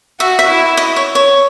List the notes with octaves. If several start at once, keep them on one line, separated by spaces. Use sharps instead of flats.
F#4 E5
E5
E4
D#5
C#5
C#5